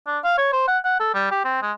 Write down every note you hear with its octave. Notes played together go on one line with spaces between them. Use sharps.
D4
F5
C#5
C5
F#5
F#5
A4
G3
G4
C4
G#3